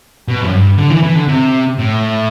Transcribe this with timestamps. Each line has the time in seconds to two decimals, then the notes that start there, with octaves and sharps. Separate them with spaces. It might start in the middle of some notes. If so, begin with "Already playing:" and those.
0.28 B2
0.42 F#2
0.52 G2
0.78 D3
0.90 E3
1.03 E3
1.15 D3
1.27 C3
1.78 A2